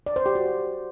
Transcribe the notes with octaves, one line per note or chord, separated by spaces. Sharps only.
D5
C5
G4
F#4